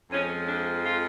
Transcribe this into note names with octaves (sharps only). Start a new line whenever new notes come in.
F2 F3 G#3 C#4
D4
F4